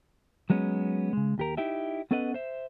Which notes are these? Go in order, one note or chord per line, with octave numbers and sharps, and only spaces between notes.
F#3 G#3 B3 C#4
C#3 G#3
D#2 G4 A#4
D#4 E4 G4 E5
B3 C#4 A4 B4 D#5 F#5
C5 E5